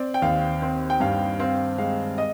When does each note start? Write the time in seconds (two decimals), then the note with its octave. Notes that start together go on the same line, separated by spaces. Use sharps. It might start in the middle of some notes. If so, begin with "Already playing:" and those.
Already playing: C4 D5
0.14 G5
0.22 D#2 F5
0.62 C4
0.90 G5
1.00 G2 F5
1.40 C4 F5
1.78 G#3 F5
2.18 D#5